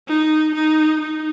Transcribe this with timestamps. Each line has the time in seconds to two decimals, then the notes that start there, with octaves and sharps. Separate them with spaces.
0.08 D#4
0.55 D#4
1.01 D#4